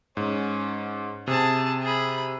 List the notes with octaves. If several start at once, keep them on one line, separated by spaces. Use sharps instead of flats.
G#2 C#4
C3 G#4 A5
G#4 B5